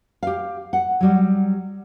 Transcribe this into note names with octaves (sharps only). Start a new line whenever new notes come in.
G4 F5
F#5
F#3 G3